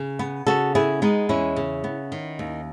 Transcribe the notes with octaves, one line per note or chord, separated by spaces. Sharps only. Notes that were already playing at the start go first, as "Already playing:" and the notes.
Already playing: C#3
B3
C#3 F#4 A4
B3 E4 G#4
G#3 B3 D#4
E2 C#4 E4
C#3
B3
D#3
D#2